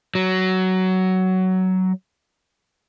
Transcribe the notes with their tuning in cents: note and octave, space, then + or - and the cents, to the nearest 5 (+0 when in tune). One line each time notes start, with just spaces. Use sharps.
F#3 +15